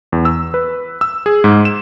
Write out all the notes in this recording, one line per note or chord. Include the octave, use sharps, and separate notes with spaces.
E2
E6
B4
E6
G#4
G#2
E7